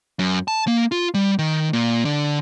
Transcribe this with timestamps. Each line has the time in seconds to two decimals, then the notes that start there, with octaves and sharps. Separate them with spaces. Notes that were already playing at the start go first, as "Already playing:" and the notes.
0.19 F#2
0.48 A5
0.68 A#3
0.92 F4
1.14 G3
1.39 D#3
1.73 A#2
2.05 D3